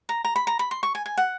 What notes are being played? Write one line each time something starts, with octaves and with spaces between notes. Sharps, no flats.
A#5
A#5
B5
A#5
B5
C6
C#6
G#5
G#5
F#5